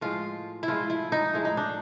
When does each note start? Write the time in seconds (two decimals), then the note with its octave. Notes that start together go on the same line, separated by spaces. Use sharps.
0.01 A2 F3 G#3 F4
0.63 E4
0.68 A2 F3 G#3 F4
0.90 E4
1.12 D#4
1.33 A2 F3 G#3 E4
1.45 D#4
1.57 D4